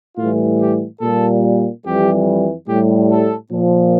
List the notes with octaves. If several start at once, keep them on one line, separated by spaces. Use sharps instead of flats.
A2 E3 G3 F4
G4
A#2 G3 A4
F2 E3 G3 G4
A2 G3 G4
A4
A#2 F3